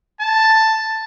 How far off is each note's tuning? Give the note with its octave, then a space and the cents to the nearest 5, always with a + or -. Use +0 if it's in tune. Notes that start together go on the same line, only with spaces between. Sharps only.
A5 +5